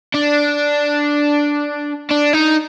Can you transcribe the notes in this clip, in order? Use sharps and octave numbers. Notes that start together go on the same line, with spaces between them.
D4
D4
D#4